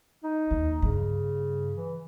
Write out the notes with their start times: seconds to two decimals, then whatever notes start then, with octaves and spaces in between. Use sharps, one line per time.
0.24 D#4
0.51 D#2
0.82 G2 C#3
1.76 E3